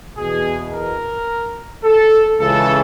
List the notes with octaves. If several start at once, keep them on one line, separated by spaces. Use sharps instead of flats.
E2 B2 G#4
A#4
A4
C#2 C#3 E3 A4